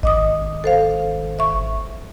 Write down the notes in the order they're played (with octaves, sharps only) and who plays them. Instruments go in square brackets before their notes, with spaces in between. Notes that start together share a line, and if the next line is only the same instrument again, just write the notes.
[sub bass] G#1 [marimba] D#5 D6 D#6
[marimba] A4 C5 F5
E5 C#6